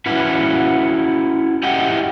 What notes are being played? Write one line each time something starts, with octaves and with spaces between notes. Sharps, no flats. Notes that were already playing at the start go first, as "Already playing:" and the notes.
C#4 E4 F#4 B4
E4 G4 D#5 F#5 G5